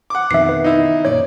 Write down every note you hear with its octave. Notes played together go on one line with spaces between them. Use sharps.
F#5 D6
F2 B2 D#3 E5 C7
B4
D#4 E4
F#2 A#2 C#5 D5